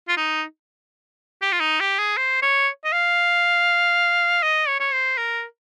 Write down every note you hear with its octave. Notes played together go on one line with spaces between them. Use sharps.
F4
D#4
G4
F4
D#4
G4
G#4
C5
C#5
D#5
F5
D#5
C#5
C#5
C5
A#4